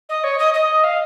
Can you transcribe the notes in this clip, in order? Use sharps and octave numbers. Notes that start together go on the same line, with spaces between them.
D#5
C#5
D#5
D#5
F5